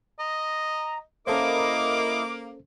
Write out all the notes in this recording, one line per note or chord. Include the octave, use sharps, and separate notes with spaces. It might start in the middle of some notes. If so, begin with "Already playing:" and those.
D#5 A#5
A#3 C#4 E4 A4 A#4 C5 D#5 D6